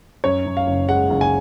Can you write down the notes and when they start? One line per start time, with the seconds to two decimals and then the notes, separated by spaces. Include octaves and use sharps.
0.24 F#2 C#5
0.46 F#2
0.57 F5
0.67 F#1
0.89 G#3 F#5
1.10 F#1
1.21 G#5